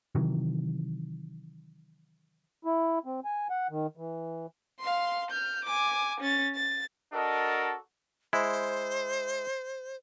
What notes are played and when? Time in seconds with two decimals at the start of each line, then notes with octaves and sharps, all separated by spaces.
0.15 C3 D#3 E3 F#3
2.65 E4
3.05 C4
3.25 G#5
3.50 F#5
3.70 D#3
3.97 E3
4.79 F5 C6
5.30 F6 G6
5.64 G#5 D6
6.20 C#4 A6
6.55 A6
7.13 D4 F#4 A4 A#4 D#5
8.33 G#3 E4 C5